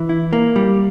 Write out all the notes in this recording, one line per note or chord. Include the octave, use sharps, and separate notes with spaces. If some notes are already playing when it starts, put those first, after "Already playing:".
Already playing: E3
E4
A#3
G3